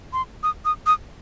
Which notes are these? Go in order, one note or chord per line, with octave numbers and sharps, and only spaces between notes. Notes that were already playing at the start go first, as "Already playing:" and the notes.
C6
D#6
D#6
D#6